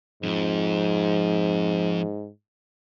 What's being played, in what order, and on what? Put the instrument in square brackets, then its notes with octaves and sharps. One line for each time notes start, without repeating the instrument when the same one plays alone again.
[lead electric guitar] F2 F3 [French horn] G#2